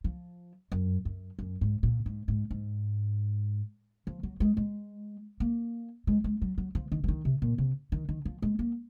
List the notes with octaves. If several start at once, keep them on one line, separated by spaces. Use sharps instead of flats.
F3
F#2
F#2
F#2
G#2
A#2
G#2
G#2
G#2
F3
F#3
G#3
G#3
A#3
G#3
G#3
F#3
F#3
F3
D#3
F3
D#3
C3
A#2
C3
D#3
D#3
F3
G#3
A#3